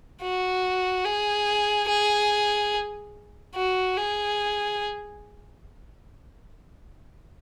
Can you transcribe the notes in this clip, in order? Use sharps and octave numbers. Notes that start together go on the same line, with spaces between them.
F#4
G#4
G#4
F#4
G#4